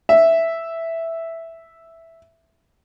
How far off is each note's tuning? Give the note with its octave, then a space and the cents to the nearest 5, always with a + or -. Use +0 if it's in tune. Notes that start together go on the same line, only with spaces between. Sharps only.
E5 +0